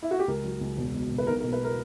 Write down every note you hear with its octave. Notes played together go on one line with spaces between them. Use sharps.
E4
F#4
G4
C#2 A#4
F#3
C#2
E1
B2
E1
B4
B1 A#4
A#4
B2
B4
A#4